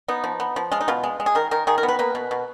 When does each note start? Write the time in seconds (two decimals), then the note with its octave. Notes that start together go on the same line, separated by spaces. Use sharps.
0.08 B3 D#4
0.24 F3
0.40 B3
0.56 F3
0.72 G#3 F4
0.81 D#4
0.88 B2 F4
1.04 G#3
1.20 G#3
1.26 G#4
1.35 D#3 A#4
1.51 D#3 A#4
1.67 D#3 G#4
1.78 A#4
1.83 B3
1.88 B4
1.99 A#3 B4
2.15 B2
2.31 B2